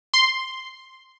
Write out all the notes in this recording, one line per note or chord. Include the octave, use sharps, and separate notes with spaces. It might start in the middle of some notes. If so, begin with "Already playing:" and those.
C6